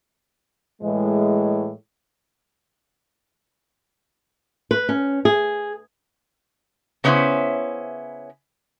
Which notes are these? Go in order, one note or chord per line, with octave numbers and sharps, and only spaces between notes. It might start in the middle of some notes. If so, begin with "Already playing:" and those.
A2 E3 G#3
B4
C#4
G#4
C#3 B3 C#4 D#4 E4 C5